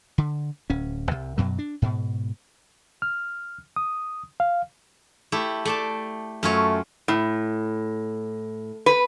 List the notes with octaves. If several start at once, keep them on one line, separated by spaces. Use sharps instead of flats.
D3
D1 C#4
C2 C3
F#2 B2 F#3
D4
G#2 B2
F6
D#6
F5
A3 E4 G4
A3 D5 A5
F#2 A3 F4 C#5
A2
B4